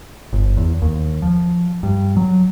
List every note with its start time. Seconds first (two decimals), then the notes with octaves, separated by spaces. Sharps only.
0.33 G1
0.57 E2
0.82 D#2
1.22 F3
1.83 G2
2.17 F#3